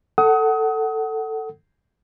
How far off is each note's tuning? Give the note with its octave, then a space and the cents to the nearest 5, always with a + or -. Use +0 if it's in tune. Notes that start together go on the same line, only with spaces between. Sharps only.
A4 +10 F#5 +20 D#6 +30